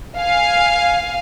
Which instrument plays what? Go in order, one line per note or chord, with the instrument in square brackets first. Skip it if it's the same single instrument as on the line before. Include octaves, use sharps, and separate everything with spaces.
[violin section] F5 G#5